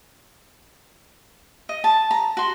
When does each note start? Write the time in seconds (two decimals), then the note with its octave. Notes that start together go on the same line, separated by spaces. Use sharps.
1.69 D#5
1.84 A5
2.11 A#5
2.37 F#4 C6